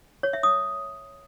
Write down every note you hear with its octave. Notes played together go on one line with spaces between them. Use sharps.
C#5
E5
D#6